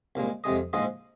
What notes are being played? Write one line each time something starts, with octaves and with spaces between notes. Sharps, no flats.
C2 A#2 G#3
F2 C3 G#3 D#5
A#1 G#2 F3 G#3 D#5